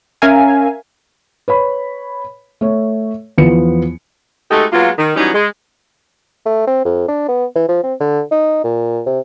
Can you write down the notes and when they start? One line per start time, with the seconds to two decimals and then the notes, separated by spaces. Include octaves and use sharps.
0.22 C#4 A#4 E5 F5 G#5
1.48 B4 C#5 B5
2.61 A3 C#5
3.38 E2 F3 B3 C#7
4.50 G#3 A3 D#4 F#4 G4 A4
4.73 F#3 G#3 A#3 B3 F4
4.98 D#3
5.16 E3 F#3 G3 C#4 D#4
5.34 G#3
6.46 A3
6.67 C4
6.85 F2
7.08 D4
7.29 B3
7.56 E3
7.68 F3
7.83 C4
8.00 D3
8.31 D#4
8.64 A#2
9.06 C3